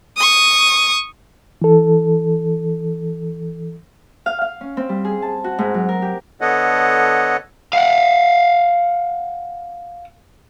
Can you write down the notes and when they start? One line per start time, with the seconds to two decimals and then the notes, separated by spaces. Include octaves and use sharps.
0.17 C#6 D#6
1.62 E3 A4
4.26 F5
4.41 F5
4.61 C#4
4.77 C4
4.89 G3
5.05 G#4
5.22 A5
5.44 F#4
5.59 G#2
5.74 F#3
5.89 A#4
6.02 G4
6.41 D3 B3 A4 C#5 D#5 F#5
7.73 F5 F#5